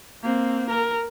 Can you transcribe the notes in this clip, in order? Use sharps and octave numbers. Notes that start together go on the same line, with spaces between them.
A#3 C4
A#4